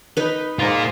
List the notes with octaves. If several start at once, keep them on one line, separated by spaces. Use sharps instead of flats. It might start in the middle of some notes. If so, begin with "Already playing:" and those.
D#4 B4
G#2 F4 A#4